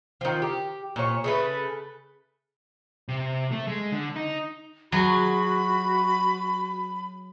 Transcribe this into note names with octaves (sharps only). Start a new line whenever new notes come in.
D#3 F3
G4
A#2 C#5
C#3 A3 B4
C3
A3
G#3
D3
D#4
F#3 F#4 G#4 B5